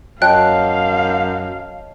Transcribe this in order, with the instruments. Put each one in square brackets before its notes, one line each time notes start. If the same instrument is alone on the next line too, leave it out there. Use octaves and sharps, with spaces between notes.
[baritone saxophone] F#2 [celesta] C#5 D#5 A5 [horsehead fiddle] F5 [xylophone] G5 F#6